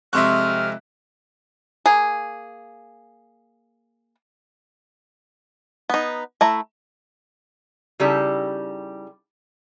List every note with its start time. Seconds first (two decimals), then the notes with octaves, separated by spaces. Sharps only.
0.13 F2 C3 G#3 E5 C6 C#6 F6 F#6
1.86 A#3 G#4
5.90 B3 D#4
6.41 A3 E4 A#5
8.00 C#3 G3 D#4 E4 G4 A4